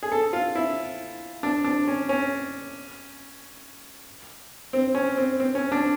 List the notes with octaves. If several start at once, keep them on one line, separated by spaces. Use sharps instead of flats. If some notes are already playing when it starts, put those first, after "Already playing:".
G#4
A4
F4
E4
D4
D4
C#4
C#4
C4
C#4
C4
C4
C#4
D4